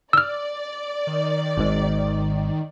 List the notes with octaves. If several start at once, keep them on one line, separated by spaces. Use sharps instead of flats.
D5 E6 F6
D#3
G#1 G#2